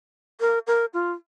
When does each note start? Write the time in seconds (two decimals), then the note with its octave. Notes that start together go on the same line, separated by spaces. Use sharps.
0.40 A#4
0.67 A#4
0.93 F4